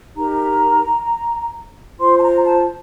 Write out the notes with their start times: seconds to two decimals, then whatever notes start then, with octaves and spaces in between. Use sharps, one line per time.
0.16 D#4 G4 A#4 A#5
1.99 F4 C5 C6
2.17 A5
2.22 A#5
2.45 A5